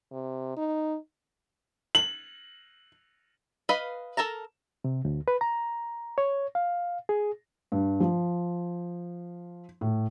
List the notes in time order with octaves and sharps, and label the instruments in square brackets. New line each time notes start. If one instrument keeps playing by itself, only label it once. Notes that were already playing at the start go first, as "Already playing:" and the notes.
[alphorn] C3
D#4
[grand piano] F#7
[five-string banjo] B4 D#5 F5 B5
A4 A#4 A5 A#5
[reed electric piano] C3
D2
B4
A#5
C#5
F5
G#4
[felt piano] G2
F3
A2